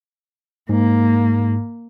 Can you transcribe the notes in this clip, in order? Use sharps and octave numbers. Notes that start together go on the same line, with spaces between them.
G#2 A#3